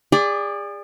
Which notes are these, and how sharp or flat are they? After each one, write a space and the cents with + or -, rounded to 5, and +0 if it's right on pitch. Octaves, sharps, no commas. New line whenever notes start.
G#4 -35 D5 +0